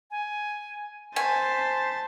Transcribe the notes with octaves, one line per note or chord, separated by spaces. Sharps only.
G#5
C5 G#5 A5 B6